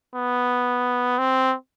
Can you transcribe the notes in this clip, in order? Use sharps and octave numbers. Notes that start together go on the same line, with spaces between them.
B3
C4